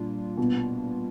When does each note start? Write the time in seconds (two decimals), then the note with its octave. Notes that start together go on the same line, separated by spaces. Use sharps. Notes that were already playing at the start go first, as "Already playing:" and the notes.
Already playing: A#2 G3 A#3 D4 F4
0.37 B2